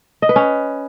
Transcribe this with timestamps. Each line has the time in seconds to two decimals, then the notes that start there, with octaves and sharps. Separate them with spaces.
0.22 D#5
0.29 B4
0.36 C#4